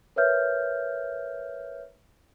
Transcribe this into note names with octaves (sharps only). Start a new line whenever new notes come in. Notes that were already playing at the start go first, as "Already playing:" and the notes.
A#4 B4 C#5 E5 F6 G6